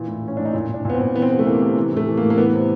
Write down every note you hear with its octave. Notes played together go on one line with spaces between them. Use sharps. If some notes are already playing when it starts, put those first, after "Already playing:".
Already playing: A#2 E3
A2
E3 C#4
A2 D4
D#4
A#2 E4
A#2
D4
A#2 B3
C4
A#2
E3 B3
C4
C3 B3
A3
E3 A#3
C3
E3
A2 A3
E3
A#3
A2
A#3
E3 B3
C3